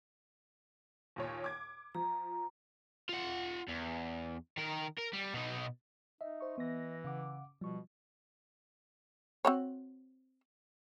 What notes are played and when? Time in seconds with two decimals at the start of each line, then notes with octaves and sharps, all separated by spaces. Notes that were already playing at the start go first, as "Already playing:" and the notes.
1.16 D#2 A#2 C#5
1.44 D6 G#6
1.95 F3 A#5
3.09 F4 F#5
3.68 E2
4.58 D#3 A#4
4.99 A#4
5.13 G3
5.34 B2 D#4
6.21 D#4 D#5 E5
6.40 C5 C#6
6.58 E3 B3 A#6
7.04 C#3 F5 F#5 D6
7.61 B2 F3 G3 C#6
9.45 C4 F#4 C#5